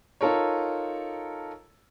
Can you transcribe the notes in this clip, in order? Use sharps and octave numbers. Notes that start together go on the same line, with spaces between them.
D#4 F4 A4 A#4 C#5